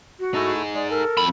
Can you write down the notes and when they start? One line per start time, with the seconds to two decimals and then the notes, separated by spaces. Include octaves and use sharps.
0.20 F#4
0.34 A3 D#4 E4 G#4 A5
0.75 G#3 D5
0.90 A4 A#4
1.17 F2 B5